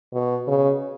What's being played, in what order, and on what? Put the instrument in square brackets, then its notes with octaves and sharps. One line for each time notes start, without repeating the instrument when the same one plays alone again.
[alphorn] B2
C#3